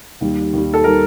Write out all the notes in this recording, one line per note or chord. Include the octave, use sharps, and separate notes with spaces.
D#2 D#3 G3
D#2 D#3 G3
A4
D#3 G3 A#4